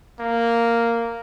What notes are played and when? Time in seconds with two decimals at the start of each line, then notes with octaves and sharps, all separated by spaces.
0.20 A#3